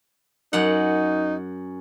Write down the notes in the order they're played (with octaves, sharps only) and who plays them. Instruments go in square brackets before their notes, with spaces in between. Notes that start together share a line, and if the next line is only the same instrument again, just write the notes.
[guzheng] F#2 F#5 [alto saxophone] D#4